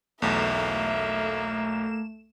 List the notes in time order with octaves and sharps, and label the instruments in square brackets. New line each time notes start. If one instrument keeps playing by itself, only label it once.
[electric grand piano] B1 E2 [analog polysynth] A3 E7 [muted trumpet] A#3 [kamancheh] E5